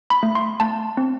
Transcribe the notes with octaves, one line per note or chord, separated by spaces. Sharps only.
B5
A3
C6
A3 A5
C4